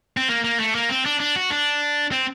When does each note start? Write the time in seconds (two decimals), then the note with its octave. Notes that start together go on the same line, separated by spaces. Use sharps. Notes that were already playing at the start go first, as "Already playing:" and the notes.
0.17 C4
0.29 A#3
0.44 A#3
0.60 A3
0.75 A#3
0.89 C4
1.06 D4
1.20 D4
1.36 F#4
1.50 D4
2.12 C4